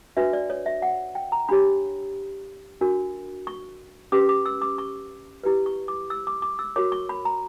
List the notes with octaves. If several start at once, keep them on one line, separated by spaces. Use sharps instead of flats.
D4 F#4 B4 E5
D5
C#5
E5
F#5
G5
A#5
D4 G4 C#5 B5
D4 F#4 A#4
C#6
C#4 G4 B4 D6
D6
E6
D6
C#6
E4 G4 B4
C#6
D6
E6
D6
D6
E6
F#4 A#4 C#5 D6
C#6
B5
A#5